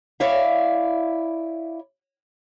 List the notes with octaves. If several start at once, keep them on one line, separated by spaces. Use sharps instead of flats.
E4 C#5 D5 E5 F5